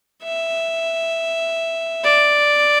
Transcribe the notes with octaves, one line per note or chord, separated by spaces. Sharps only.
E5
D5